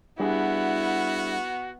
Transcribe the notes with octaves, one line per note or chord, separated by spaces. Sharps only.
G3 B3 D4 E4 F#4 G#4